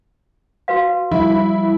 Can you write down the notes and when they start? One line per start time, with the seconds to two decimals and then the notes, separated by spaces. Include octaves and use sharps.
0.68 F#4 B4 F5
1.11 F3 G3 E4